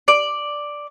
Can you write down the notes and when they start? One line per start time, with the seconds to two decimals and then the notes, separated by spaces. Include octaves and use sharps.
0.08 D5